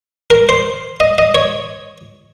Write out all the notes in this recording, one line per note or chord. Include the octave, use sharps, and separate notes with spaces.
A#4
C5
D#5
D#5
C#5